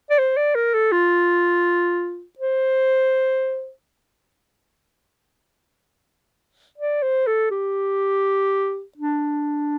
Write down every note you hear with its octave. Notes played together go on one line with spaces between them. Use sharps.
D5
C5
D5
A#4
A4
F4
C5
D5
C5
A4
G4
D4